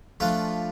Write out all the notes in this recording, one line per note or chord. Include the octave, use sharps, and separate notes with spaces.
F3 A3 D4 F4 B4